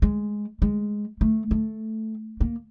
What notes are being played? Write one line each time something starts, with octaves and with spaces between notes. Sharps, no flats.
G#3
G#3
A3
A3
A#3